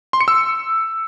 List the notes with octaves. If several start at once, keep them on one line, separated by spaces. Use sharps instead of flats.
C6
C#7
E6